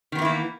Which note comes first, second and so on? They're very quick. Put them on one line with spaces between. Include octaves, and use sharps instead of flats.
D#3 B3 E3 E4 A#3